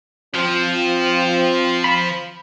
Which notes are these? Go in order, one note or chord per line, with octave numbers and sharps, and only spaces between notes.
F3 C4 F4
B5